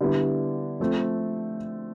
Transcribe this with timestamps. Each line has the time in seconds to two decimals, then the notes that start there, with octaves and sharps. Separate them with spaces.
0.01 D3 G3 B3 E4
0.80 F3 A3 C4